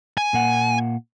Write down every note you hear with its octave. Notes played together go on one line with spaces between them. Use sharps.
G#5
A#2 A#3 F#5